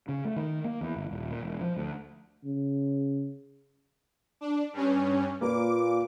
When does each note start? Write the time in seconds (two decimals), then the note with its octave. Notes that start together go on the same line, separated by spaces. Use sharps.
0.09 C#3
0.25 A3
0.36 D#3
0.64 A#3
0.81 E2
0.97 G1
1.11 D#1
1.30 A#2
1.43 E1
1.61 F3
1.76 D2
2.44 C#3
4.41 D4
4.73 G2 C#4
5.41 A#2 A#3 B4 D6